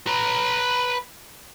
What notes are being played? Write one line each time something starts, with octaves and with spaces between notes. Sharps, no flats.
B4 A#5